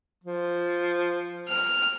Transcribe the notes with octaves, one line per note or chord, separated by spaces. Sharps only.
F3
F6